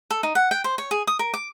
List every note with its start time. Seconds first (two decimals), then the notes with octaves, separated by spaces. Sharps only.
0.10 A4
0.23 D#4
0.35 F#5
0.51 G5
0.64 C5
0.78 C#5
0.91 G#4
1.07 D#6
1.19 A#4
1.34 D6